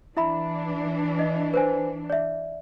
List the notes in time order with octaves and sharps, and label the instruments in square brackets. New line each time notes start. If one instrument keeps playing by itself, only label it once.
[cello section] E3 D4 [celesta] E4 E5 B5
[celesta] D#5
B4 C5 G#5
D5 E5